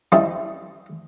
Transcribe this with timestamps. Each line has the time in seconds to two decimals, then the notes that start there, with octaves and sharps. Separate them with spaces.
0.12 F3 G3 C#4 D#4 E4